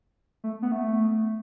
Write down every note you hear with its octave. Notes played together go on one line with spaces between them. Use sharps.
A3
B3
A3